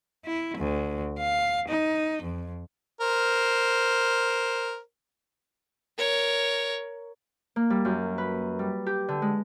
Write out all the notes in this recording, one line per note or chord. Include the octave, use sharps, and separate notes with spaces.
E4
D2
F5
D#4
F2
A#4 C5
A#4 C#5
A#3
G3
F#2
B4
G3
G4
D3
G#3